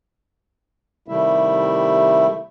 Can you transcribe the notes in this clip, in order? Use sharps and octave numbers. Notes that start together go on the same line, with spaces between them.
C3 D#3 G3 A3 E4 E5